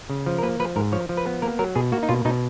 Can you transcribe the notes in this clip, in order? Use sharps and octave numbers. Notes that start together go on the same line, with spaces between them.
C#3
F3
A#4
A#3 B4
F3 B4
G#2 A#4
F3 C#5
F3
B4
B3
A#3 A#4
F#3 A#4
B2 G#4
A#3 F#4
D#4
B2 F4
B2 D#4